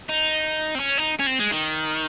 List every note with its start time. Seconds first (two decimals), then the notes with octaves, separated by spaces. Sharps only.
0.09 D#4
0.75 C4
0.80 C#4
0.98 D#4
1.20 C#4
1.27 C4
1.39 G#3
1.51 D#3